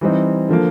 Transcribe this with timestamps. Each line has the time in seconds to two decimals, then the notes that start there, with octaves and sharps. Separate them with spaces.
0.01 E3 G3 C4 D#4
0.49 D3 F3 A#3